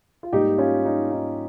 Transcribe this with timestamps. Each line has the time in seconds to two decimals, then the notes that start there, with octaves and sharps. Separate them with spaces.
0.23 F4
0.32 G#2 G3 A#3 D#4 G4
0.58 C#4 F4
0.85 D#4
1.11 D#4